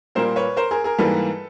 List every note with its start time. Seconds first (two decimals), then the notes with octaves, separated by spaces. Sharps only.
0.15 A#2 G3 A#3 A#4 C5
0.36 B4 C#5
0.57 A#4 C5
0.71 G#4 A#4
0.84 G#4 A#4
0.98 G#2 E3 G3 A#3 A4 B4